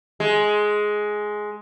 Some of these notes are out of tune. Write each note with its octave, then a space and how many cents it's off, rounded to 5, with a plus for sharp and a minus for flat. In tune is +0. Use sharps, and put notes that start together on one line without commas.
G#3 +10